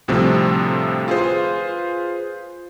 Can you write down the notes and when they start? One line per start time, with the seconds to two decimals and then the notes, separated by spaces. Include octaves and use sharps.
0.08 D2 A2 C3 F3 G3 C4
1.08 F4 G#4 B4 C5